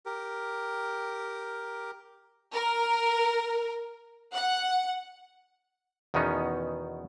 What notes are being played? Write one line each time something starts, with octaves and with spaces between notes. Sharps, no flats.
G4 A#4
A#4
F#5
E2 B2 D#3 B3 C#4 D#4